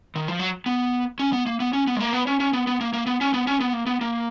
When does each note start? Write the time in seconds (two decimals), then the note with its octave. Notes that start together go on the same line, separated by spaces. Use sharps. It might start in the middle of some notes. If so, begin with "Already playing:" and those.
0.16 D#3
0.28 F3
0.39 F#3
0.66 B3
1.19 C#4
1.33 B3
1.46 A#3
1.60 B3
1.73 C#4
1.87 B3
1.95 G#3
2.00 A#3
2.13 B3
2.27 C#4
2.40 C#4
2.53 B3
2.67 B3
2.81 A#3
2.93 A#3
3.06 B3
3.21 C#4
3.34 B3
3.47 C#4
3.60 B3
3.73 A#3
3.86 B3
4.01 A#3